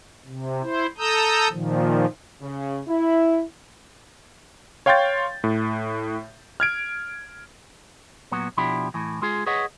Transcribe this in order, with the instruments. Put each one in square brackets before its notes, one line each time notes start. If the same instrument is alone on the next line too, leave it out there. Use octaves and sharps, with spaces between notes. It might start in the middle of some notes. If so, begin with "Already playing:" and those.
[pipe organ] C3
E4 C5
A4 A#5 D#6 E6 G6
A#2 D#3 F3
[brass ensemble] C#3
E4
[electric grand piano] C#5 F5 G5 C6 G6 A6
A2
F6 G#6 D7
[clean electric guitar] A#2 F#3 B3 F#4
B2 F3 D4 E4 G4 B5
A2 E3
G#3 F4 G#4
G#4 B4 C#5 D#5 F#5